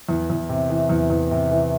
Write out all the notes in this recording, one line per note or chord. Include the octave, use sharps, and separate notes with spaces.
E2
E2
C3
E3
E2
E2
C3
E3